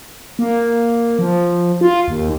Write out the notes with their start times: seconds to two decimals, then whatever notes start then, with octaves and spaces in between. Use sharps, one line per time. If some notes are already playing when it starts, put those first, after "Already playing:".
0.39 A#3
1.19 F3
1.81 F4
2.08 D#2